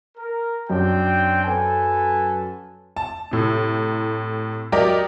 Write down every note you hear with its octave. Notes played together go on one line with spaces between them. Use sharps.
A#4
F#2 C4 D4 G5
A4 B4 G#5
A5
A2 C3
F#3 G4 A#4 D5 D#5